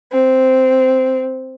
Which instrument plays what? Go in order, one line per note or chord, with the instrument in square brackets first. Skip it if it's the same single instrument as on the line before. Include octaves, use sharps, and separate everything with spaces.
[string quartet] C4